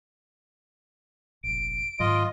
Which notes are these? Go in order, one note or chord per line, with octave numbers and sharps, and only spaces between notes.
F1 A#1 D7
G#2 D#3 F#3 F4 D#5